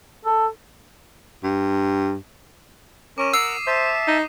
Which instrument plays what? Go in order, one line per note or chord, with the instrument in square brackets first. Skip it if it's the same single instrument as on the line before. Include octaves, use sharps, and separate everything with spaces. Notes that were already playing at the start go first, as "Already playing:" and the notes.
[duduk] A4
[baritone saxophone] G2
[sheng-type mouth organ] C#4 A#4 [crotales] D6 D#7 E7
[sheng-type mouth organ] A#4 F#5 [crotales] D#6 C7 [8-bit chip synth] E6
[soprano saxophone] C5 [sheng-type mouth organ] E5 A5
[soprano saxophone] D#4